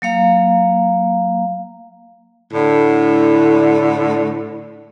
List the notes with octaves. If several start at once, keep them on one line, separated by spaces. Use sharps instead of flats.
F#3 A#3 F5 A#5
A2 D3